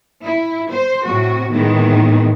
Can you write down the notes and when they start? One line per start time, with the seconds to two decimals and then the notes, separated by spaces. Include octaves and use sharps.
0.24 E4
0.70 C5
1.05 A2 C3 F#4
1.51 A2 D#3 E3 G#3 B3